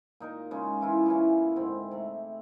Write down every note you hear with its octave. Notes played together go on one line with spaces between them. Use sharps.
A#2 D#4 A#4
C#3 G#3 C#4 F4
E3 E4 F4
A#2 E3 C#4
G#2 D3 C4
C3 A3